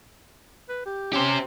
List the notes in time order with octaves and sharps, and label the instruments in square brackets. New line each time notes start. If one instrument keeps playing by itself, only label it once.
[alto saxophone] B4
G4
[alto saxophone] C#4 [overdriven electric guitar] G4 C5